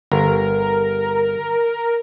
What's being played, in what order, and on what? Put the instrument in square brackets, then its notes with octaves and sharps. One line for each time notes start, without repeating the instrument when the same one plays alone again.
[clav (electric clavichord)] G1 [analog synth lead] A#4